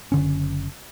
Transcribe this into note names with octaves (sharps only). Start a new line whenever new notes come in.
F#1 D3 C#4